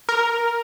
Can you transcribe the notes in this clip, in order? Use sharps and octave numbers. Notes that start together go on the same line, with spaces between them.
A#4